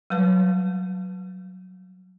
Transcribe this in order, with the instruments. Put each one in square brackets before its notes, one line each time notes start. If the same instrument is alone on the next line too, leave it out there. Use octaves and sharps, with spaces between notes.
[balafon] F#3 G3 B4 A5